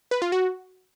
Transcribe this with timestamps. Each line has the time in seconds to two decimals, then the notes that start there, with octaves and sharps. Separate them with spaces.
0.11 B4
0.22 F4
0.32 F#4